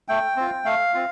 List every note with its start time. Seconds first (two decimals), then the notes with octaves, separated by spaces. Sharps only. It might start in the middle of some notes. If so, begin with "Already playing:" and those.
0.08 A3 G5
0.37 C4 F4
0.65 A3 F5
0.94 C4 F4